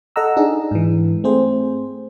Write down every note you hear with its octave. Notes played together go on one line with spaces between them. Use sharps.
A4 D#5 F#5 A#5 E6
D4 D#4 G#4
G#2 E3
A3 C4 G#4 C5